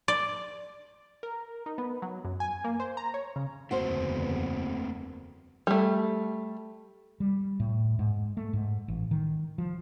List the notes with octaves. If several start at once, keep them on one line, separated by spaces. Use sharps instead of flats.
D5
A#4
D#4
B3
F#3
F#2
G#5
A#3
C5
A#5
C#5
C#3
F#1 E2 D3 A3 A#3 C4 F#4 C5
G3 A3
G3
A2
G#2
A3
G#2
A1
D#3
F3